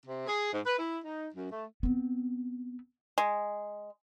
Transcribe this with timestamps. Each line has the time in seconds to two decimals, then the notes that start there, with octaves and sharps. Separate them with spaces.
0.06 C3
0.27 G#4
0.52 G#2
0.66 B4
0.78 E4
1.04 D#4
1.34 F#2
1.51 A3
1.83 B3 C4
3.18 G#3